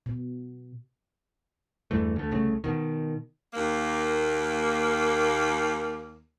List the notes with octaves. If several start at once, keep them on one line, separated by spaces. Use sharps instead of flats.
B2
E2 G2 E3 A3
D2 A3
C2 C#3 A3
B2 D#3
D#2 A#3